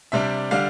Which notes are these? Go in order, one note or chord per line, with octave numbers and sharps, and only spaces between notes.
C3 G3 D4 E5
D3 G3 D4 F5